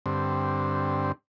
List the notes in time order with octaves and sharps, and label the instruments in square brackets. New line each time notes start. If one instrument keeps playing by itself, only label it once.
[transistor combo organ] G2 D3 C4